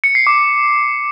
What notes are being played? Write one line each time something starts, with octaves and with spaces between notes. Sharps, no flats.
C#7
C7
D6